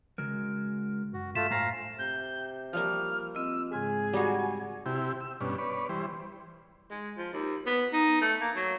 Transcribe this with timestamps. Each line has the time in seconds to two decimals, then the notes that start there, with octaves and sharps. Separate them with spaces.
0.18 C#3 G#3 F#4 A#4
1.13 F#2 F#4
1.35 G2 A3 F4 B6 E7
1.51 A2 C5 F5 G#5 A#5
1.99 C3 G6
2.73 F3 G3 A#3 F6
3.35 C4 F4 D#5 E6
3.72 G#2 C#3 G#3 G#4 G#5
4.13 G3 D#4 F#4
4.86 C3 E4 G4
5.21 E6
5.41 G2 B2 C#4 D4
5.58 B4 C#5 D5
5.89 E3 G3 C5
6.91 G#3
7.18 F3
7.33 D#2
7.66 B3
7.93 D#4
8.21 A3
8.41 A#3
8.56 F#3